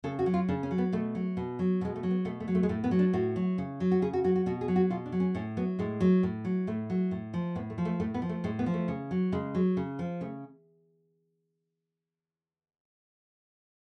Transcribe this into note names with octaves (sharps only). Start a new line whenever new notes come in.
C#3 A4
F#4
F#3
F4
C#3 D4
C#4
F#3
B3
B2 A3
F#3
B2
F#3
B2 G#3
A3
F#3
B3
B2 A3
A3
F#3
A3
G#3
A2 A3
B3
F#3
D4
A2 F#4
F#3
C#3
F#3
F#4
C#3 G#4
F#4
F#3 F#4
F#4
B2 F#4
G#4
F#3
F#4
B2 F4
D4
F#3
C#4
A2 C#4
F#3 B3
A2 G#3
F#3
A2
F#3
A2 A3
F#3
A2
F3
A2 B3
A3
F3
A3
A2 A3
B3
F3
A3
A2 G#3
B3
F3
A3
C#3
F#3
C#3 G#3
F#3
C#3
F3
C#3 A3